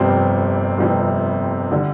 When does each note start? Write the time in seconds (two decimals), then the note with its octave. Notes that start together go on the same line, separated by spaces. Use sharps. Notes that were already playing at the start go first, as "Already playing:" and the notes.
Already playing: G1 F2 C3 G3 C4
0.78 G1 F2 C3 G3 C4
1.72 D3 G3